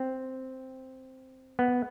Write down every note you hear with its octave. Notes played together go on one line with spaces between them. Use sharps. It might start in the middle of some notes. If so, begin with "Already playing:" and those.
Already playing: C4
B3